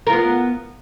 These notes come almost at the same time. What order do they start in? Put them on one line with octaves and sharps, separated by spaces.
A#4 F4 B3